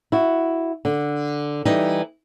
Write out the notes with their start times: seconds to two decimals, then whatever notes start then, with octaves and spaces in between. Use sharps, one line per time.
0.12 E4 F#4
0.85 D3
1.65 E3 G3 D#4